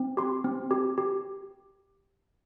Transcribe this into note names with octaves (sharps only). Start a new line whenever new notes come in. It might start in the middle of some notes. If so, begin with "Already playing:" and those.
Already playing: C4
G4 C6
C4
G4
G4